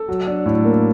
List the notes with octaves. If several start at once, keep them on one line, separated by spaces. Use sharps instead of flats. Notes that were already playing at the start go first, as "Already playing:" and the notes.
Already playing: A4
F#3
D4
A2
A#3